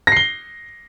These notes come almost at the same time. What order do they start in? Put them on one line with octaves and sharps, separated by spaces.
A#6 C7 G7